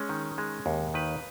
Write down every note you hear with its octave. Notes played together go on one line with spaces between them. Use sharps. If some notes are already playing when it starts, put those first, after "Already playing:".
Already playing: G#3 C#4
D#3
G#3
D#2
D#3 B4